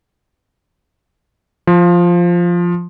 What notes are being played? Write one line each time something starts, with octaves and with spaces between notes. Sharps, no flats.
F3